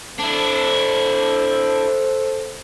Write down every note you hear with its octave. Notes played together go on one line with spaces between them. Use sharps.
D4 E4 A4 C5